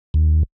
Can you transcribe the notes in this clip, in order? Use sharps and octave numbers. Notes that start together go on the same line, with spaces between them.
D#2